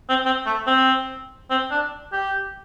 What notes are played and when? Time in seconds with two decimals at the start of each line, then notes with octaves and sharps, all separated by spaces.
0.09 C4
0.25 C4
0.46 A3
0.67 C4
1.50 C4
1.71 D4
2.12 G4